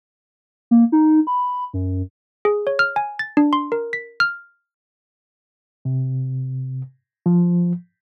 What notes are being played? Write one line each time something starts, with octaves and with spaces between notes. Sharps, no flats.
A#3
D#4
B5
F#2
G#4
C#5
F6
G#5
A6
D4
C6
A#4
B6
F6
C3
F3